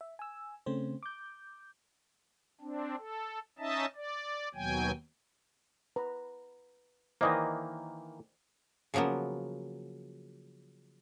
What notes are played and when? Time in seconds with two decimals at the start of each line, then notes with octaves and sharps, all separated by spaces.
0.01 E5
0.19 G#5 E6
0.66 C#3 A3 C4 C#4 C5
1.03 D6 G6
2.61 C4 D4
2.98 A4
3.59 C#4 D#4 D#5 E5 A5
3.95 D5
4.55 D#2 B2 F#3 G5 G#5
5.96 B4 A#5
7.21 D#3 E3 A#3 C5 D5 D#5
8.94 C#3 F3 F#3 A#3 B3